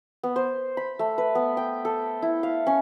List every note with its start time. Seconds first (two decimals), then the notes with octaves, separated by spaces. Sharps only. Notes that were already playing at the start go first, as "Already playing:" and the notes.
0.23 B3
0.36 C5
0.77 B5
0.99 A3
1.18 B4
1.35 B3
1.57 G5
1.85 A4
2.22 E4
2.43 F5
2.67 C#4